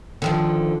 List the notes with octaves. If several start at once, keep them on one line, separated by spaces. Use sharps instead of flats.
D3 D#3 F3